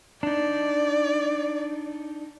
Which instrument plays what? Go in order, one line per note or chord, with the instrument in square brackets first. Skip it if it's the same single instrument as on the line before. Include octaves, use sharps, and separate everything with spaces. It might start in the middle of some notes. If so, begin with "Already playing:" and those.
[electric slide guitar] D4 D#4 [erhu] D5